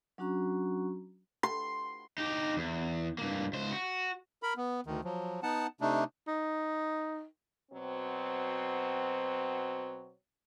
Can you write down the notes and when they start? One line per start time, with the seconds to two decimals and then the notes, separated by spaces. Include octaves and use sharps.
0.18 F#3 C#4 D4 F#4 A#5 C#6
1.43 C6
2.18 D#4 G4
2.57 E2
3.18 G2 A#3
3.53 C#2 C5
3.71 F#4
4.43 A#4 B5
4.57 B3
4.87 D2 D#3
5.04 F3 F#3
5.43 B3 D#4 F#5 A5
5.81 C3 A3 D4 D#4
6.28 D#4
7.71 B2 F#3 C4